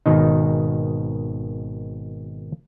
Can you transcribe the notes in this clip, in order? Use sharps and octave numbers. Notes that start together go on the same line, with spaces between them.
G#1 B2 D#3 D#4